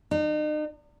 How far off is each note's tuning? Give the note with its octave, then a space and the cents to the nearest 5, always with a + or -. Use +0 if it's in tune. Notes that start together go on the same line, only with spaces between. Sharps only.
D#4 -40